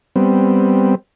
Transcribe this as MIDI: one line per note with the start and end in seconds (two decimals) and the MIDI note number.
0.16 0.95 55
0.16 0.95 59
0.16 0.95 60